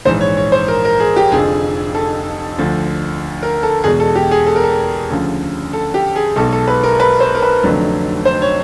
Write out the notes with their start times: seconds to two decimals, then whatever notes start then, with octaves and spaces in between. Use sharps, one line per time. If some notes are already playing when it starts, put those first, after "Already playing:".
0.05 A#1 G#2 E3 C5
0.21 C#5
0.37 C#5
0.52 C5
0.68 A#4
0.85 A#4
1.00 G#4
1.16 G4
1.32 F1 F2 D3 F3 G#4
1.95 A4
2.58 D2 D3 F3
3.43 A#4
3.63 A4
3.84 E2 B2 G#3 G#4
4.00 A4
4.15 G4
4.31 G#4
4.47 A4
4.56 A#4
4.63 A4
5.10 D2 C#3 F3
5.73 A4
5.94 G4
6.16 G#4
6.36 B1 B2 G#3 A4
6.52 A4
6.67 B4
6.83 A#4
7.00 B4
7.20 C5
7.35 A#4
7.42 B4
7.63 F1 F2 D3 F#3 A3
8.25 C5
8.42 C#5